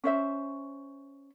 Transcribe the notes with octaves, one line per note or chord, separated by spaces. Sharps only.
C#4 C5 E5